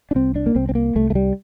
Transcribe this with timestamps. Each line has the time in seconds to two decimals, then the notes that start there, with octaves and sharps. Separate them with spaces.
0.11 D4
0.15 C2 C4
0.36 D4
0.46 A#3
0.55 C2 C4
0.69 C4
0.75 A#3
0.95 C2 A3
1.10 A3
1.15 G3